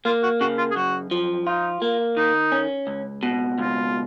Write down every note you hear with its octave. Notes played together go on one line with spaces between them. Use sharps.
A#3 F4
F#4
C#3 F#4
F4
G#4
F#2 F#4
F3
D#4 F4
A#3
D#3 D#4
C#4
C#2
B2
C#2 F4